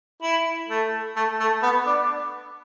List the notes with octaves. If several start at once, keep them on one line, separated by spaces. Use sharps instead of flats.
E4
A3
A3
A3
B3
D4